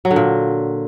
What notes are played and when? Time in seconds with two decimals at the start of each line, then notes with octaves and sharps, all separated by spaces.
0.05 F#3
0.11 D3
0.16 A#2